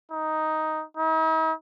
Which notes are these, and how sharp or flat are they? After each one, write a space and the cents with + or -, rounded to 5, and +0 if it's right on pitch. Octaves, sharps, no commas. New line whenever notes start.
D#4 +5
D#4 +45